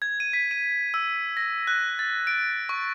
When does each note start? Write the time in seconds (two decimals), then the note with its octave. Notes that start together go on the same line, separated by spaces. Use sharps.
0.02 G#6
0.20 D#7
0.33 B6
0.51 D#7
0.94 E6
1.37 A#6
1.67 F#6
1.99 A6
2.27 D7
2.69 C#6